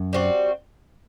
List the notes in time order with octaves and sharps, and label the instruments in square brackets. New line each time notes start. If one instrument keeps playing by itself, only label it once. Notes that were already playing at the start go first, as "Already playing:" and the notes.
Already playing: [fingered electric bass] F#2
[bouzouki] G3 C4 F#4